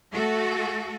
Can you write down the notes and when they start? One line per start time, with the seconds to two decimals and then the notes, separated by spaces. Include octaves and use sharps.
0.12 A3 F#4 A4